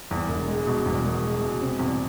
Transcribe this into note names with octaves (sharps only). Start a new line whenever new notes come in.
E2
E1
G#3
B2
E2
E1
G#3
B2
C3
E2